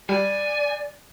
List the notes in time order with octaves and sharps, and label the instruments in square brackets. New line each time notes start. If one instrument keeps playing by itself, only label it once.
[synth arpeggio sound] G3 [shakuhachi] D5 [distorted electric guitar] G#5